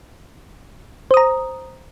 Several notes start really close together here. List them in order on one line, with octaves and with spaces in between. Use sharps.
C5 D#6 A#5